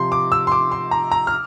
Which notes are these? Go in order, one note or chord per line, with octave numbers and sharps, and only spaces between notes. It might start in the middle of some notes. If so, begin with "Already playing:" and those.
Already playing: C3 F3 C6
D6
E6
C6
D6
C6
A#5
A#5
F6